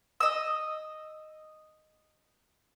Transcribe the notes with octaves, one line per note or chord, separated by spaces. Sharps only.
D#5 E6